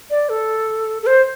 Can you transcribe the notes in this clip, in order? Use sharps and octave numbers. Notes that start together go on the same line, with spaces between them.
D5
A4
A4
C5